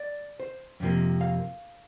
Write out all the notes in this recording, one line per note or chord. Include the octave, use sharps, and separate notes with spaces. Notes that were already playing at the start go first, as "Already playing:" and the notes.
Already playing: D5
C5
F2 C3 F3 A#3
F5